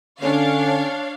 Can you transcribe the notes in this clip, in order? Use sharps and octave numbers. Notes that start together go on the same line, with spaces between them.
D3 C#4 D4 C#5 F5